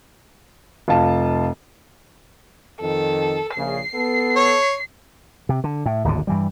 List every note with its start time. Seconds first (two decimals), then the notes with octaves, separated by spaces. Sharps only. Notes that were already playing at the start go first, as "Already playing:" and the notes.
0.88 F1 F4 A5
2.81 F2 D#3 A4
3.56 A#1 C#3 C7
3.94 B3 A4
4.36 C#5
5.49 C3
5.64 D3
5.86 A2
6.04 D1 G#1 D#2 D3
6.27 G2 E3 G3